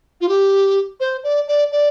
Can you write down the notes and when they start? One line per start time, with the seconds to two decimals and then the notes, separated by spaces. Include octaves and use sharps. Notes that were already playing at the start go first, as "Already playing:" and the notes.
0.21 F4
0.29 G4
1.00 C5
1.24 D5
1.48 D5
1.72 D5